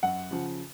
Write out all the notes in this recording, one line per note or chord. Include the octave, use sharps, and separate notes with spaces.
F#2 F#5
C#3 F3